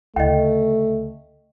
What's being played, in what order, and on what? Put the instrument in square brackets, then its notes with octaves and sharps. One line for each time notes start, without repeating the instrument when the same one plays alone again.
[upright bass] D2 C#3 [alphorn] A3 [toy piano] D#5 G5